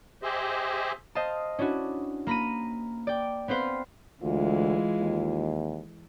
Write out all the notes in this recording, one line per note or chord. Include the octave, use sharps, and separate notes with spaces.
G4 G#4 C5 D#5 E5
C5 D#5 F5 A5
C#4 D4 E4 F#4
A#3 A#5 B5 A#6 D#7
D5 G5
B3 C4 B4 C5 F5
D2 E3 G#3 F4
D#2